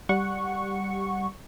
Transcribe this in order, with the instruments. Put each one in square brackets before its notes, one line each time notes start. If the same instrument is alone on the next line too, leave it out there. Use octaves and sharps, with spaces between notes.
[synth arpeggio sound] G3 F#5 C#6